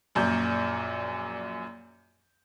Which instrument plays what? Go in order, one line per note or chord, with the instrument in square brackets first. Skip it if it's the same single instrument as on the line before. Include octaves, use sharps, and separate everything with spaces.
[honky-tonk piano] A#1 F#2 A#2 G6